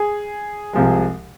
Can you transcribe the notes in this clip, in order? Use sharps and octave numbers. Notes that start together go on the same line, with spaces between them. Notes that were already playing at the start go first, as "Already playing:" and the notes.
Already playing: G#4
C2 C3 F3 G#3